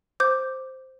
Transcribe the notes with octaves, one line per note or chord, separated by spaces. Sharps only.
C5 D6 G6